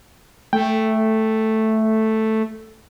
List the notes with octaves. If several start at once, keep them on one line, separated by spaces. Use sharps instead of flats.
A3 G5